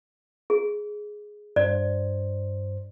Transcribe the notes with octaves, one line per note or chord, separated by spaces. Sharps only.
G#4
G2 C5 D5